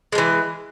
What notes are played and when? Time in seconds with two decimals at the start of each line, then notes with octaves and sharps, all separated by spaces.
0.12 G#3
0.15 F3
0.18 E3